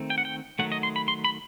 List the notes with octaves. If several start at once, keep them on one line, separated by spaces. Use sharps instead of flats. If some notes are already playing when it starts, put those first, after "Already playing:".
Already playing: D#3 A3 C4
G5
F#5
G5
D#3 F#3 A3 F#5
D#5
C6
B5
C6
B5